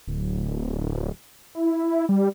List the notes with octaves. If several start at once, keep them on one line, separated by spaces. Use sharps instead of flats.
D1
E4
G3